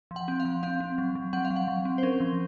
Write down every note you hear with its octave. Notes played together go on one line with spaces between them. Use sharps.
F3
F#5
C4
F5
F3
C4 F5
C4
F#3
F#3
C4 F#5
F5
F#3
F#5
F#3
C4
C5
C#4 A#4
F3